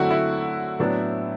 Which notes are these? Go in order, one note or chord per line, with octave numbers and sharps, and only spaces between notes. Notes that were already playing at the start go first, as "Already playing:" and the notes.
Already playing: D3 F#3 A3 C4 E4 F#4
E4
A2 F#3 B3 D4